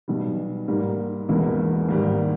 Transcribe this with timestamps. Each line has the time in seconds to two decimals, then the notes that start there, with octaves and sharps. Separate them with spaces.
0.08 B1 B2 G3
0.68 G#2 G3 A#3
1.29 E1 E2 B2 A#3 E4
1.88 G#1 G#2 G3 A#3